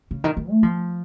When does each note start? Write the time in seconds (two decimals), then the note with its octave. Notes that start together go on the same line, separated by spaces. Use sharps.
0.11 C#3
0.24 D#3
0.37 D#3
0.50 A3
0.63 F3